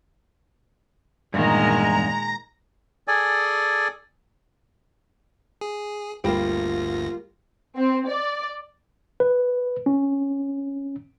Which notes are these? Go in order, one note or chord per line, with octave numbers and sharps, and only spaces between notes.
E2 G2 A#2 D#3 G#3 A#5
G#4 A4 D5 G#5
G#4
G1 D2 G3 A#3 F4 A#6
C4
D5
B4
C#4